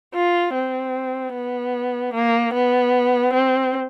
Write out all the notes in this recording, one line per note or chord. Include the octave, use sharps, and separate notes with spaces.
F4
C4
B3
A#3
B3
C4